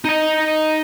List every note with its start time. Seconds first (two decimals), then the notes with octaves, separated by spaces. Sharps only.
0.05 D#4 D#5